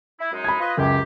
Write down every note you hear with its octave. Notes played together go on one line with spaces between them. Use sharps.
E4
F#2 G#3 D#4
B5 G#6
F4 B4 D#5
C#2 F#2 G4